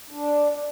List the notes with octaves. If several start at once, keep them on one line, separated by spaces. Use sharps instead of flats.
D4